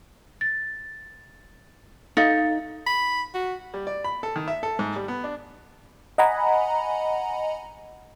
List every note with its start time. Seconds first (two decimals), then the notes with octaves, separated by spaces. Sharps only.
0.41 A6
2.17 D#4 A4 F5 A6
2.87 B5
3.34 F#4
3.74 G3
3.87 D5
4.04 B5
4.23 A4
4.36 D#3
4.48 E5
4.63 A4
4.79 G#2
4.96 G3
5.08 B3
5.24 D4
6.18 D#5 F#5 G#5 A#5 B5